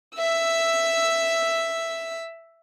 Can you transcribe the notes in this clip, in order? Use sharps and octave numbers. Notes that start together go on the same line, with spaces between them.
E5 E6